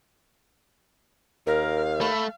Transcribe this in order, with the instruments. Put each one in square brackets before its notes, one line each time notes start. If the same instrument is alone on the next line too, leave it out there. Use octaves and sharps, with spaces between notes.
[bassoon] D#2 [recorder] A#4 [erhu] F5
[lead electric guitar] A3 [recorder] B5